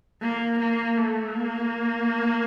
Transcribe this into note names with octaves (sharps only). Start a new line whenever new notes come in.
A#3
A#3
A3
A#3